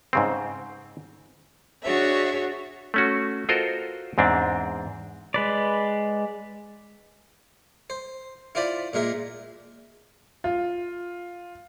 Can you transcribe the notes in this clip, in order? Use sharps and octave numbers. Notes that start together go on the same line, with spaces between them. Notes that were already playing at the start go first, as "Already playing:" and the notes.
G#2 C#3 C4
D4 F#4 G#4 C#5 E5
A3 C#4 F#4
F4 F#4 A4 A#4 C5 D#5
E2 G#2 C4 D4
G#3 B4 D5
C5
E4 F4 C5 D5 B5
A#2 G#3 A#4 E5
F4